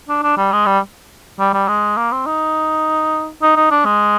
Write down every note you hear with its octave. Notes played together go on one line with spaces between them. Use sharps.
D4
D4
G3
G#3
G3
G3
G3
G#3
A#3
C4
D#4
D#4
D#4
D4
G#3